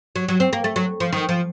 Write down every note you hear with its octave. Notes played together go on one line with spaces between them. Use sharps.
F#3
F#3
C4
A#3
A3
F#3
F3
D#3
F3